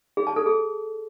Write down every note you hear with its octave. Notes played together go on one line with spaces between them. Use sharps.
G#4
A5
A4
G#4